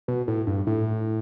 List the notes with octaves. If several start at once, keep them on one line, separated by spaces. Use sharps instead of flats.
B2
A2
G2
A2